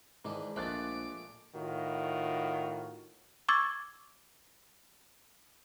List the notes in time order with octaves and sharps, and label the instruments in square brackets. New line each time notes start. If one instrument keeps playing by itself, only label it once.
[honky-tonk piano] G#2 [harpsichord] D#3 E3 D4
[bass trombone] A#1 [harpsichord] A#2 G#3 A3 [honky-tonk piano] C5 F#6 A6 [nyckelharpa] D6
[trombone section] A2 D#3 F4 F#4
[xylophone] C#6 D6 E6 G#6 A6